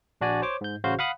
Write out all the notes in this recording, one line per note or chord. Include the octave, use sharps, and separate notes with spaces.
A#1 D4 F#4 D5 G#5
C5 C#5 D6
G#2 G6
A1 C#3 F#4 C5 F5 G6
F5 F#5 B5 D#6 F#6